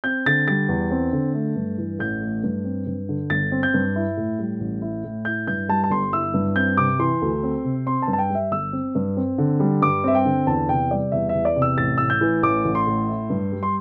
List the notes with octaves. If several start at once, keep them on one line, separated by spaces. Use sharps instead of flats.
C4 G6
D3 A6
G3 A6
E2
C4
D3
A3
G2
E3
A1 G6
A3
G2
C4
G2
D3
G1 A6
C4
G6
G2
E4
A2
G3
A1
E4
A2
E4 G6
G2 G6
G3 A5
A5
G1 C6
E4 E6
G2
C4 G6
C3 D6
E3 C6
D2
C4
C3
C4 C6
A5
G2
A5
G5
G3
E5
G1 E6
C4
G2
C4
D3
G3
G2 D6
C4 E5
G5
D3
E2 A5
C3 G5
G3 D5
E2 E5
E5
E2
D5
C3
E6
A1 A6
A2 E6
G6
E3
A1 D6
A1
C6
A2
E4
G2
G3
C6